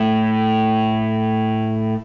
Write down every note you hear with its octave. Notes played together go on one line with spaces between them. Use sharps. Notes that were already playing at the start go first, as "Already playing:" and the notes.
Already playing: A2